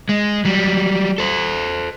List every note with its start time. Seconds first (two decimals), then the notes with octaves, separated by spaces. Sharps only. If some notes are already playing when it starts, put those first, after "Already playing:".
0.09 G#3
0.45 F#3 G3
1.18 A4 C5